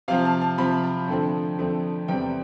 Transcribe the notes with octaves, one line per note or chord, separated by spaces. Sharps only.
C3 F3 C4 F5
A5
A5
C3 F3 C4 B5
A5
F2 D3 A3 C4
F2 D3 A3 C4
E2 C3 G3 C4 G5